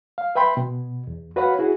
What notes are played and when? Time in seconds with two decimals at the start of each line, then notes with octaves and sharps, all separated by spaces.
0.18 F5
0.35 B4 E5 G5 B5 C6
0.57 B2
1.07 E2
1.36 F#4 B4 C#5 F5 F#5 B5
1.59 E4 F#4 G#4